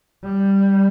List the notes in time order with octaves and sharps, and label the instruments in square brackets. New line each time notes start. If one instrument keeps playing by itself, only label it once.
[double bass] G3